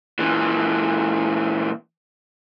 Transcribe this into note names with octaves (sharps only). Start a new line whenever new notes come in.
A#2 E3